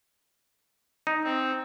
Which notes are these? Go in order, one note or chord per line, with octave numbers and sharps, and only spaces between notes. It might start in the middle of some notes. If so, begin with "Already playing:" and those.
D#4
C4